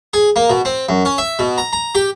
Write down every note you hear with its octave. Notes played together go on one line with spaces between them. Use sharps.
G#4
A#3
B2
C4
F#2
C#4
E5
B2
A#5
A#5
G4